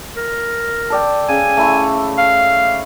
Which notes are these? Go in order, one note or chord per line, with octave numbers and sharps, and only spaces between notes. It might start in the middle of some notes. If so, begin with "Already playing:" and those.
A#4
A4 D5 G5
C#3 G#5
A3 E4 C#6
F5